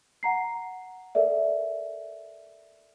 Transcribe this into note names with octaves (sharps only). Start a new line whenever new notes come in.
F#5 A#5 C7
A4 A#4 D5 E5